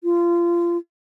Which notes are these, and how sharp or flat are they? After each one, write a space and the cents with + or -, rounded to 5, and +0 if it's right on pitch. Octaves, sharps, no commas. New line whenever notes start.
F4 -25